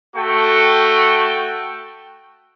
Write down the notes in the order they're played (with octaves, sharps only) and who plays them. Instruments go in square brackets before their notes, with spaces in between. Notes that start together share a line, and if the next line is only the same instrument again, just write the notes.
[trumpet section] A3 F#4 A4 G5 C#6